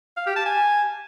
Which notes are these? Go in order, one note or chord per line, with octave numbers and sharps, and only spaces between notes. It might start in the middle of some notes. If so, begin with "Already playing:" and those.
F5
G4
A5
G#5